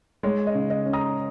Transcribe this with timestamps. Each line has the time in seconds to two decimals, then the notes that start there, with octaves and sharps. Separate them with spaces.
0.23 G#3 C#5
0.47 D#5
0.55 C#3
0.70 D#5
0.86 C#4
0.93 A#5 D#6